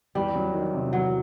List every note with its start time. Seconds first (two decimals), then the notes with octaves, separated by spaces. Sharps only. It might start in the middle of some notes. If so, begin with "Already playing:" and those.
0.15 E2 G3
0.35 F#3
0.54 D#3
0.74 C3
0.93 E2 F#3